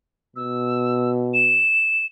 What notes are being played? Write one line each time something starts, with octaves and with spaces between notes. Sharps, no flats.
B2 E6
E7